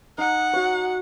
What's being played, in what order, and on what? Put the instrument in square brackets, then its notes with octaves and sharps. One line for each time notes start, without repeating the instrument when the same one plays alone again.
[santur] D#4 [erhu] F#5
[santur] F#4 C#5